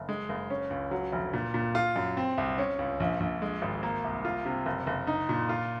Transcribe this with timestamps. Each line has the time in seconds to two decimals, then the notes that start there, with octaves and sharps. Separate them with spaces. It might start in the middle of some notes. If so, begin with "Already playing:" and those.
Already playing: F#1
0.09 G#3
0.29 F#1
0.50 C#4
0.71 C#2
0.91 F#3
1.12 F1
1.34 A#2
1.54 A#2
1.75 F4
1.96 F#2
2.17 C4
2.38 C2
2.58 C#4
2.79 C#2
3.00 A#1
3.20 A#1
3.42 G#3
3.62 G#1
3.83 A#3
4.04 C2
4.25 F4
4.45 C3
4.66 F#1
4.87 F#1
5.07 D#4
5.29 A#2
5.49 F4